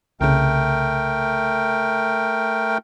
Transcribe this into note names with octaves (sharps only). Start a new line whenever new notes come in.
C2 C#3 A3 A#4 G5